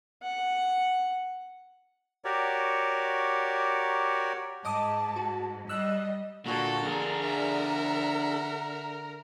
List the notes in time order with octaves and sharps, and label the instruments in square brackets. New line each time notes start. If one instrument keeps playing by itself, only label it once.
[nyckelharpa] F#5
[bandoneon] F#4 G4 A#4 C#5 D5
[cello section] G#2 [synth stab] D#5 D6 D#6 [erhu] A5
[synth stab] F#4
[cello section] G3 [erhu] D#5 [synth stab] E6 F#6
[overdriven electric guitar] A#2 [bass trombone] D3 [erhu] F#4 [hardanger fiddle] A4
[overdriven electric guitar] D4 G#4 [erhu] A#4
[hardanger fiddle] E5 F#5